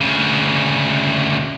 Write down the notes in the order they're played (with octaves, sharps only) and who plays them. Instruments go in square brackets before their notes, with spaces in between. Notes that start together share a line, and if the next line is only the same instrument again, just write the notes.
[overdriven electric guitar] D2 C#3